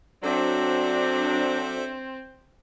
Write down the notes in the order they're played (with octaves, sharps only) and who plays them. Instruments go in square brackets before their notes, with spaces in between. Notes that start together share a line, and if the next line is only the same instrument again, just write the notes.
[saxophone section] F#3 D4 [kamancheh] C4 [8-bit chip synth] A4 C5 E5